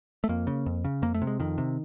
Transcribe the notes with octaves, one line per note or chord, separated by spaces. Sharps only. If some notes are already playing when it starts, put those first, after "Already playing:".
A3
F2 A#3
C#3
F2
C#3
F2 A#3
A3
C3
G#3
F2 D#3
C3